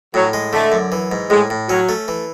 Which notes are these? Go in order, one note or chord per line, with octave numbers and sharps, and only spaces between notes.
A2 F#3
G#3
D3 A3
F#2
E3
G#2
A2 G#3
A2
F#3 C#4
A3
E3